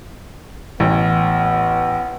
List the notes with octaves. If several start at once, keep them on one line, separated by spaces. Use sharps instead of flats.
A1 B3